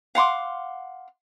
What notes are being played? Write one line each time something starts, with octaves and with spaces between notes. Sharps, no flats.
F5 F#5 C6 D6